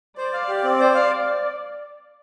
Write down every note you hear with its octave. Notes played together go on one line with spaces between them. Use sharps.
C5 D5
F5
G4
C4
C5
F5